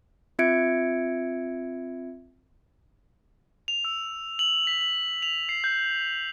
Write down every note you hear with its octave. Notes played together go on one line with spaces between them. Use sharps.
C4 F4 E5 G#6 C#7 D7
F7
E6
F#7
B6
F#7
F7
C7
G6